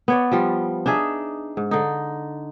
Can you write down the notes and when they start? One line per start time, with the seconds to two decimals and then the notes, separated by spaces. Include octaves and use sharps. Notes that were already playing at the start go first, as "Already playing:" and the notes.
0.08 B3 C#5 D5
0.32 F3 G3 F4
0.86 D4 D#4 G#4 E5
1.57 G#2
1.71 D3 D#4